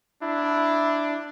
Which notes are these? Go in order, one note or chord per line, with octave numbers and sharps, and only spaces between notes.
D4 E4